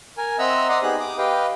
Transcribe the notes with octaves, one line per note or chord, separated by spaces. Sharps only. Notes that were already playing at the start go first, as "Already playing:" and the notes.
A#4 G#5
C4 D#5 E5 F#5 A#5 E6
D5 D#5 F#5 A#5 C6 D#6
B3 D#4 G4 G#4 F#6
D6 D#6
G4 B4 D#5 F5 G5